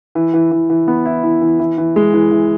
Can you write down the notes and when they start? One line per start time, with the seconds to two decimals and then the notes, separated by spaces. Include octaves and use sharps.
0.15 E3
0.34 E3
0.51 E3
0.70 E3
0.88 B3
1.06 E4
1.24 E3
1.42 E3
1.60 E3
1.78 E3
1.96 G#3
2.14 E3
2.31 E3